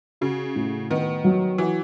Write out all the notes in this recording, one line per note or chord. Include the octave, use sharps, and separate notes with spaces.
C#3 F#4
A2
D#3 B3
F#3
E3 F#4